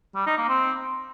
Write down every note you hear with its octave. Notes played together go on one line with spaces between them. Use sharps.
G3
D#4
A#3
C4